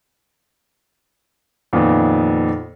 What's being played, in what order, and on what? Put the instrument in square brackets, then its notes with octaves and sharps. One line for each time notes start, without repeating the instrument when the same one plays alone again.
[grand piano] F2 A#2 D#3 B3